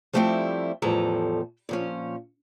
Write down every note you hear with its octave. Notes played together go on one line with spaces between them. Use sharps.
F3 G3 A3 C4 E4 G4
E2 A2 F3 G3 A4 A#5
A#2 F3 C#4